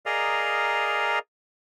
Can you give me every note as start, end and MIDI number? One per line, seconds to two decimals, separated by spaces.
0.06 1.19 68
0.06 1.19 70
0.06 1.19 74
0.06 1.19 75
0.06 1.19 77
0.06 1.19 82